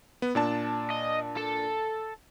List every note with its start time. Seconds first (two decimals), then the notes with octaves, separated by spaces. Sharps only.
0.22 B3
0.35 A#2 D4 A5
0.91 D#5
1.37 A4